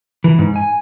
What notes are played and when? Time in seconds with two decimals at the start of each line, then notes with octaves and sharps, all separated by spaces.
0.24 E3
0.39 G#2
0.56 G#5